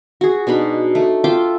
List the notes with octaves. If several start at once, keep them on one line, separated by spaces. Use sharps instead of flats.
F#4 G#4
B2 D4 D#4 B5
A3
F4 E5 G5 D6